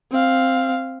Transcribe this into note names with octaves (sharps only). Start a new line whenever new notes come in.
C4 F5